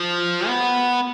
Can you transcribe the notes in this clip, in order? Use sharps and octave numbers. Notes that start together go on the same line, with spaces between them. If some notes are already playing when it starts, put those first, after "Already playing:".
Already playing: F3
B3